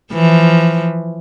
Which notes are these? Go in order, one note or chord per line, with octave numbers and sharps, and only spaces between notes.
E3 F3